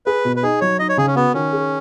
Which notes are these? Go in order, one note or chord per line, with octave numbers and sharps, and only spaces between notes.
G#4 B4
B2
B4
D#4 G#4
F#3 C#5
D#4 D#5
C#5
C#3 G#4
C#4
B3 F#4
D#3 C#4
G#4